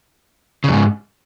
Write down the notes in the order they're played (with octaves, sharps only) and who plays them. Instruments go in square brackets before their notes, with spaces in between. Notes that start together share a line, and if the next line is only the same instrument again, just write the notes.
[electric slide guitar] C#3
F2
G#2